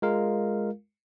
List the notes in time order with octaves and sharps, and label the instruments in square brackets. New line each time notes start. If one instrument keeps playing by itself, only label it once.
[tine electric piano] G#3 F4 A#4 F5